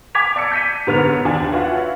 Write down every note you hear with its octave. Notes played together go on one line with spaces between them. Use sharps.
G#5 D6 G#6 B6 F7
D5 A5 E6 C#7
G6 B6 D#7
G#2 D3 B3 C#5 F6 F7
D#2 D4 G#5
F4 F#4 B4 C#5 E5 F#5